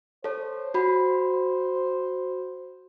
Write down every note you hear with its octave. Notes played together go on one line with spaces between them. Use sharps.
A4 C5 C#5
F#4 B5